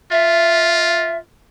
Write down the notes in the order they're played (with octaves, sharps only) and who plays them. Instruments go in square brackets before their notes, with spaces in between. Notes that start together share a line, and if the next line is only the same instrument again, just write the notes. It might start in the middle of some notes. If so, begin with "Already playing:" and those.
[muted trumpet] F4 [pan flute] E5